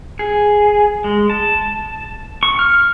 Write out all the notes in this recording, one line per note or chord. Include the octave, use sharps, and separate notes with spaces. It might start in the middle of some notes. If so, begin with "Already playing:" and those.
G#4
G#3
A5
C#6
F6